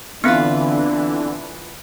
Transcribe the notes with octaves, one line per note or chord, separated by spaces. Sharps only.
D3 E3 B3 C4 D4 F4 B4 E5